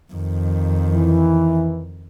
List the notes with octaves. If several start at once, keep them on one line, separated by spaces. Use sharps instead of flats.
F2 D#3
E3